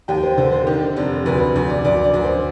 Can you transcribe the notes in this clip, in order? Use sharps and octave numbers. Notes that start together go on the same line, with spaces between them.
D#2 G5
C5
D3 C5
C5
D#3
F1
D2 B4
D2
D5
D2 D5
D5
D2
C5